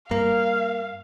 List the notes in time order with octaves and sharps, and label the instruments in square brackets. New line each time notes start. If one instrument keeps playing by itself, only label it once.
[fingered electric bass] G2 [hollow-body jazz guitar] A#3 [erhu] F5